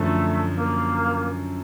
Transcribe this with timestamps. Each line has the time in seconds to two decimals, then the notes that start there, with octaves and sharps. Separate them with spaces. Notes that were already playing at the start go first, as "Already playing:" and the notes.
Already playing: F#2 D3 F3 A3
0.54 A#3